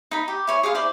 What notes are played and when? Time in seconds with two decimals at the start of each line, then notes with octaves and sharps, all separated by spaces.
0.11 D#4 B5
0.28 G4
0.47 E4 C#5 G#5
0.63 G#4 D5 F5 C6
0.75 E4 C5 D5